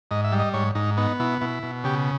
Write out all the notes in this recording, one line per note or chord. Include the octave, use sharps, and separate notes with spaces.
G#2 D#5
E5
G3
D#5
G#2 C#5
G#2 D#4
B3 D#4
B2 E4
B2 E4
B2
C#3 G4